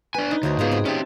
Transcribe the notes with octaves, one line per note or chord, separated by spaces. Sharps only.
D4 B4 G#5
D#4
D2 F#4 C5 C#5
G#2 B3 F4 G#4 C#5
C4 G#4
C#4 G4 E5 A5